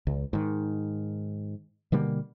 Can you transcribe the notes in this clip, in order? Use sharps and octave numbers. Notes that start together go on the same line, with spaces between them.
C#2
G#2 D#3
B2 D3 G3 A#3